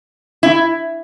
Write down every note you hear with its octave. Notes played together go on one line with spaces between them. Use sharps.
E4